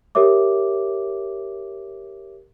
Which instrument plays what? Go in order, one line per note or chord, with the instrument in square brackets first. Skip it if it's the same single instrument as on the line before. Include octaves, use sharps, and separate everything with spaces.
[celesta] G4 A#4 C#5 E5 D6